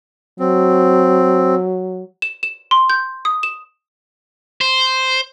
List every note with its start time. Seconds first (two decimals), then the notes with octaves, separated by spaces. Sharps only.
0.40 F#3 C4
2.22 E7
2.43 E7
2.71 C6
2.90 G6
3.25 D#6
3.43 E7
4.61 C5